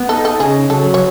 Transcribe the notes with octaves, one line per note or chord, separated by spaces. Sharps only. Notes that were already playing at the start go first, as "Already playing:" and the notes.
Already playing: B3
D#4 A4
A4
C#3 G#4
F#3 A4
C#5